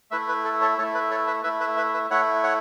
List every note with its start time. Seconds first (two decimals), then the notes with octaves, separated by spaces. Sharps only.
0.11 A3 E4 B4 E5
0.28 B4
0.44 A4
0.61 A4 C#5
0.78 A3 E4 A4 C#5
0.94 B4
1.11 A4 C#5
1.27 B4 E5
1.44 A3 E4 B4 E5
1.60 B4 E5
1.77 B4 E5
1.93 B4 E5
2.10 A3 E4 C#5 F#5
2.43 C#5 F#5